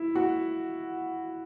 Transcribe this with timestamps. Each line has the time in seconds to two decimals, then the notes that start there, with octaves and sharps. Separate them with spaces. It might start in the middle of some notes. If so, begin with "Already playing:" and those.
Already playing: E4
0.16 F#4